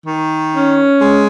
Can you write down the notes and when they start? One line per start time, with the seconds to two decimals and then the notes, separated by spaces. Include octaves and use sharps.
0.07 D#3
0.53 C#4
1.00 G#3